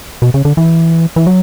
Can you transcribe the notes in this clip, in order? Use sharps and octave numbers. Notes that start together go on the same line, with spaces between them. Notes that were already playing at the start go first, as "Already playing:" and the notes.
B2
C#3
D3
E3
E3
F#3